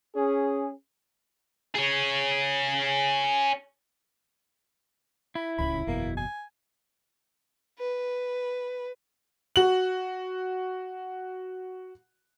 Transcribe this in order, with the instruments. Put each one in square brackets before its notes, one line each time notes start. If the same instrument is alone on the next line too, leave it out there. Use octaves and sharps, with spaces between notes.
[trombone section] C#4 G#4
[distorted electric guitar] G#4 C#5
[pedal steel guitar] E4 [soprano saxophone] B5
[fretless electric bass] D1 C#2 C#3 [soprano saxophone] B5
[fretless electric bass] F#1 E2 B2 [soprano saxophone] A#3
[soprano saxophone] G#5
[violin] B4
[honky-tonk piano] F#4 F#7